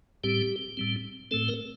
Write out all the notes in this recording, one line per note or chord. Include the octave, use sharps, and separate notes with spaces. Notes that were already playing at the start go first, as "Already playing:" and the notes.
A2 G3 C4 G4
A2 G3 C4
A2 A3 C4 A4
A#4